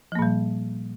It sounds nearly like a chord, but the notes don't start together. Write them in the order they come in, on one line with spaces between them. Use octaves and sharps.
F3 A#3 A#2 G3